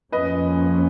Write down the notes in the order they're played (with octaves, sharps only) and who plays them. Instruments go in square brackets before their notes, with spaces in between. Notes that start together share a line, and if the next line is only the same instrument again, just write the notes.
[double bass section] F2 F3 A#3 C#4 [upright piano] B4 D#5